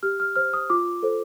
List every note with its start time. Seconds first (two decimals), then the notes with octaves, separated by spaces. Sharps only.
0.03 G4 F6
0.20 F6
0.36 C5 F6
0.53 D#6
0.70 F4 D6
1.03 A4 C5